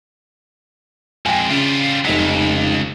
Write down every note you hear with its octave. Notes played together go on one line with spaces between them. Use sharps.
F2 G#3 G5 G#5
C#3 G3 F4
F1 F#3 D#4 B6
C#2